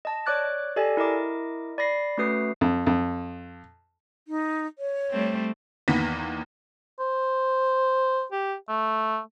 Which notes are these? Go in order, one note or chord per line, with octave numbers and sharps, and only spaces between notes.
D#5 A5
C#5 D5 D6 F#6 A6
G4 A4 D5 D#5 G#5
E4 A#4 D#5 D6
D5 B5 A#6 C7
A3 C#4 F#4 B4 D#6 C7
F2
F2
D#4
C#5
G3 A3 C4
E2 D#3 A#3 B3 A#6 B6
C5
G4
A3